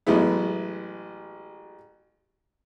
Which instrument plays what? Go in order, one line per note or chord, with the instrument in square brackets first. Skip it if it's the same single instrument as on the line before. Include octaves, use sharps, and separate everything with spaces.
[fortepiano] A1 F#3 G#3 B3 E4